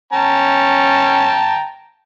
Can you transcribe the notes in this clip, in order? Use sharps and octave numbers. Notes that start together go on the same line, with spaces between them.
C#4 G5 A5 A#5